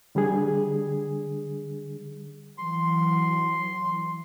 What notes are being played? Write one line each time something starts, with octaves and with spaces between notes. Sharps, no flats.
D3 G3 D4 G#4
E3 F#3 C6